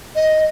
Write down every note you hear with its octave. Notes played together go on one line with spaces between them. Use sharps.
D#5